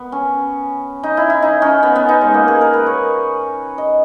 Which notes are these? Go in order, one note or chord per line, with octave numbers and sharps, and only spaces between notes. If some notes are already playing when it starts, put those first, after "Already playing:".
Already playing: B3
C#4
D#4
E4
E4
D#4
C#4
B3
B3
D#4
G#3
A#3
G#4
A#4
B4
C#5
D#5